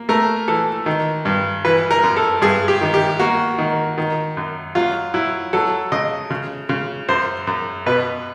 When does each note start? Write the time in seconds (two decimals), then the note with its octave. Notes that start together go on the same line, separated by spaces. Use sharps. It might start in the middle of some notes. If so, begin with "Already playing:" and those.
Already playing: A#3
0.09 A3 A#4
0.48 E3 A4
0.86 D#3
1.25 G2
1.65 E3 B4
1.91 A#4
2.03 F#2
2.16 A4
2.42 G2 G#4
2.68 G4
2.81 D#3
2.94 G4
3.19 A#3 F#4
3.58 D#3
3.98 D#3
4.37 F#2
4.75 F#3 F4
5.14 F#3 E4
5.53 F#3 A4
5.92 C#3 D#5
6.30 C#3
6.69 C#3
7.09 F#2 C5
7.47 F#2
7.86 B2 B4